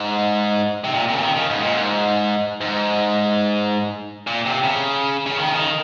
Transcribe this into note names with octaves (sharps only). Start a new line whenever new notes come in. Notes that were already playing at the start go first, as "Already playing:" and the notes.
Already playing: G#2
C3
A#2
C3
C#3
D#3
C#3
G#2
A#2
G#2
G#2
A#2
C3
C#3
C#3
D#3
C#3
D#3